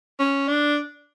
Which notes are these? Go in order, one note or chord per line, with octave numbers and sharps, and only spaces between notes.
C#4
D4